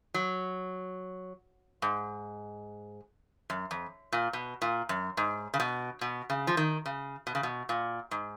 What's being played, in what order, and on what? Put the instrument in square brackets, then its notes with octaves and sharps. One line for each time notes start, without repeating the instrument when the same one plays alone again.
[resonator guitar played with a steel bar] F#3
G#2
F#2
F2
A#2
B2
A#2
F#2
G#2
C#3
B2
B2
C#3
F3
D#3
C#3
B2
C#3
B2
A#2
G#2